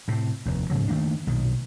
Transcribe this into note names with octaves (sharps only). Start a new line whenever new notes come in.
A2 C3
F1 D#2
G#2 C#3 F3 F#3
D#3 A3 A#3 D4
B1 A#2 D#3